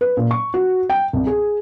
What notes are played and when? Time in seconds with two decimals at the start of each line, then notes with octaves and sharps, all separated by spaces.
0.01 B4
0.17 A#2
0.31 C#6
0.54 F#4
0.90 G5
1.13 C2
1.27 G#4